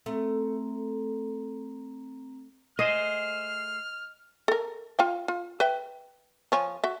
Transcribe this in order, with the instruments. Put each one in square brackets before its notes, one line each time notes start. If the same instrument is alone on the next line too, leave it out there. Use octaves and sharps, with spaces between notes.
[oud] A3 [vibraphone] C4 A#5
[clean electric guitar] A3 G#4 C5 [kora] D#5 [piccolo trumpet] F6
[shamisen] A4 A#4
F4 F5 G5
F4
B4 E5 G5
F3 C#5 G#5
F#4 E5